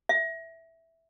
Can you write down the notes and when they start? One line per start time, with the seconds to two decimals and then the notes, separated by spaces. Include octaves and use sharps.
0.09 E5